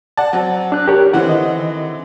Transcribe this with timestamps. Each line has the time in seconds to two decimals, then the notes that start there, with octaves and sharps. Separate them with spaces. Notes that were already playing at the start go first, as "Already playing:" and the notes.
0.17 D5 F#5 A5
0.33 F#3 C4
0.72 D4 F#6
0.88 G4 A#4 C#5
1.13 D3 E3 C4 F#5
1.26 D#3 D#5